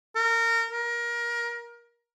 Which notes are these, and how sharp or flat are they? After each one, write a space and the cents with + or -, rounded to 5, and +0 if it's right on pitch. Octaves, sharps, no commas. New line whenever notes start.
A#4 -25
A#4 +25